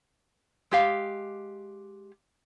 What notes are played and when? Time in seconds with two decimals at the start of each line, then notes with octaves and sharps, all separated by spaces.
0.71 G#3 G4 F5